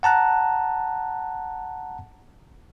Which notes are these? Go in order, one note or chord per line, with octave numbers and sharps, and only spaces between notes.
F#5 A5 A#5 F#6